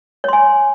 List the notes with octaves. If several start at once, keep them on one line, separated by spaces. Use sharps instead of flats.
C#5 G#5 C6